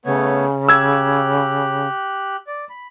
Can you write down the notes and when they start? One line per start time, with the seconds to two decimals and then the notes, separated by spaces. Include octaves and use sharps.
0.05 C#3 A3 B3 C#5
0.69 G4 E6 F#6 G#6
2.47 D5
2.70 B5